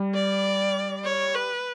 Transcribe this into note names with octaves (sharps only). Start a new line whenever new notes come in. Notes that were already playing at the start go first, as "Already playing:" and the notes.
Already playing: G3
D5
C#5
B4